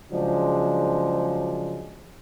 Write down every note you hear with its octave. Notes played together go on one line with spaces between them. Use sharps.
C#3 F3 F#3 G#3 D4